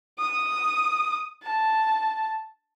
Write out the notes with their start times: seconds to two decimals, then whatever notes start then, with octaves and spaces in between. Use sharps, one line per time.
0.19 D#6
1.43 A5